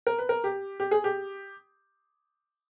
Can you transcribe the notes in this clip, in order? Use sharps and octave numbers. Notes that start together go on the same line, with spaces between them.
A#4
B4
A#4
G4
G4
G#4
G4